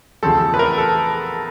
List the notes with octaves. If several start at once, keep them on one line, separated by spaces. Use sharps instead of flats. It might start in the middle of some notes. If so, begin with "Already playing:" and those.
E2 C#3 F3 A3 C4 A4
B4
A#4
A4